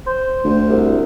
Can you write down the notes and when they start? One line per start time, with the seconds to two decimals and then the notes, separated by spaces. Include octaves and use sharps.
0.07 C5
0.45 D2
0.69 C2